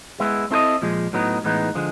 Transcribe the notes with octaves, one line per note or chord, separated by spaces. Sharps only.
G#3 B3 E4
C4 E4 A4 C5 D#5
A#2 F3 G#3
A2 F#3 B3 D#4
A2 E3 G#3 B3 D#4
D3 F3 G#3